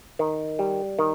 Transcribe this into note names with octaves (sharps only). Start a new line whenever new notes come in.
D#3
G3
D#3